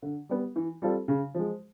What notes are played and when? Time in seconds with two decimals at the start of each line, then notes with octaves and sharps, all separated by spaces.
0.02 D3
0.29 G3 B3
0.56 E3
0.82 G3 C4 F4 A4
1.08 C#3
1.34 F3 G#3